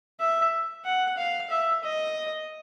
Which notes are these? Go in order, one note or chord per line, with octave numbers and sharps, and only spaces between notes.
E5
F#5
F5
E5
D#5